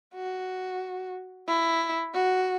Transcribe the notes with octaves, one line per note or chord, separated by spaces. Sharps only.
F#4
E4
F#4